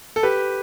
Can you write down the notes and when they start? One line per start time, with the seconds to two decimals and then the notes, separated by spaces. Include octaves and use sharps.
0.16 A4
0.23 G4 B4